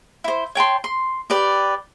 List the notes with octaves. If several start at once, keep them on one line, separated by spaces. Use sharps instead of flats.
E4 C5
C#5 G5 A5 C6
C6
G4 B4 D5